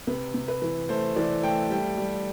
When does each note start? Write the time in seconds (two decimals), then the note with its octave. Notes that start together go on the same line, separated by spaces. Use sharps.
0.07 C3 B4
0.34 C3
0.48 B4
0.62 E3
0.89 A3 C5
1.16 E3 D5
1.43 A3 G5
1.71 G3 G5
1.98 G3